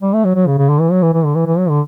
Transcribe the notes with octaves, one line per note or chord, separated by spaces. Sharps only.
G3
A3
F#3
F#3
C#3
C#3
D3
E3
F#3
E3
E3
D3
E3
E3
F#3
D3